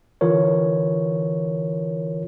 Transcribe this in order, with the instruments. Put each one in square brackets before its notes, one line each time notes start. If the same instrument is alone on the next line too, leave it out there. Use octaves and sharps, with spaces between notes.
[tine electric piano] D3 E3 F4 A#4 C#5